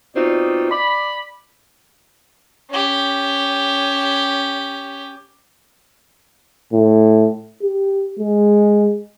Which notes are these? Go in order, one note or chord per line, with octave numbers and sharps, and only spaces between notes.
B2 C4 D#4 F4 D5
D5 B5
C#4 G4
A2
G4
G#3